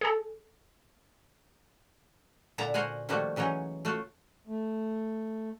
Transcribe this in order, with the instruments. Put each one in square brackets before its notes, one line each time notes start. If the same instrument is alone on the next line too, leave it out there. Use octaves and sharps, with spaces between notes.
[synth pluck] G#4 A4
[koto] A#2 D3 E4 E5 A5 A#5
F#4 A#4 C5 F#5 G#5
D#3 F3 G3 A3 A#3 F#4
C#3 E3 F#3 C#4 D#4
A3 F4 F#4
[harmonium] A3